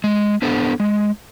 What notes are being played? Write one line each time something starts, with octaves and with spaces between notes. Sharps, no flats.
G#3
B3 D4 A4 C5
G#3